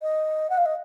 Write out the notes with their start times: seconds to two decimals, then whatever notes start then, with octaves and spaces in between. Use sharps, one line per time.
0.02 D#5
0.50 F#5
0.57 F5
0.65 D#5